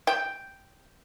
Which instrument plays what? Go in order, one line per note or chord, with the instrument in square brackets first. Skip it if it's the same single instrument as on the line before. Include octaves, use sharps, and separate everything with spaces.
[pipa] G5